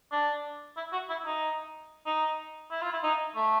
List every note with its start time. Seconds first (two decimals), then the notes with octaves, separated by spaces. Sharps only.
0.12 D4
0.77 E4
0.92 F#4
1.09 E4
1.26 D#4
2.06 D#4
2.71 E4
2.82 F4
2.92 E4
3.03 D#4
3.36 A3